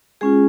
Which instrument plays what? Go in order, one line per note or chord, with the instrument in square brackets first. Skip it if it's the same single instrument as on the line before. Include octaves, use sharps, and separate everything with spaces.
[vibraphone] G#3 C#4 F4 G#4